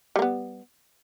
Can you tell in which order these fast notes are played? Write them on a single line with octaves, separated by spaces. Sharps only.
G3 A#3 B3